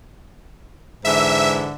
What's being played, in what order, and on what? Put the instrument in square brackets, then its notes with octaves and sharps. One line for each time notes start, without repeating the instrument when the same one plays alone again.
[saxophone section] G#2 D3 E3 [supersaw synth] E5